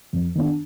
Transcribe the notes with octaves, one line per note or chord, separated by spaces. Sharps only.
F2
D#3 B3 D4